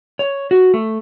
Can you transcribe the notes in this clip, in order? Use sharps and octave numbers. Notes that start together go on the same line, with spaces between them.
C#5
F#4
A3